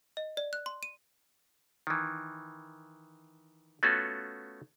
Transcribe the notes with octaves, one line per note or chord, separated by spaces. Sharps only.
D#5
D5
F#6
C6
D#7
D#3 E3
A3 B3 C#4 F4 F#4 A4